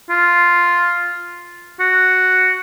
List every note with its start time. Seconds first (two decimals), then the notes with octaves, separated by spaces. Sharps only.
0.10 F4
1.80 F#4